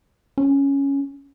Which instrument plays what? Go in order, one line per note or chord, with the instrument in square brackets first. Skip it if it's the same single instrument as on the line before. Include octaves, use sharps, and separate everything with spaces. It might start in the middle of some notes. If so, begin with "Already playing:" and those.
[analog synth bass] C#4